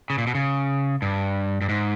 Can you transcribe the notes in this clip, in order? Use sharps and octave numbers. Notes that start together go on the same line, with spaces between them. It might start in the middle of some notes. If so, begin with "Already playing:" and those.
C#3
A#2
B2
C#3
G2
G2
G#2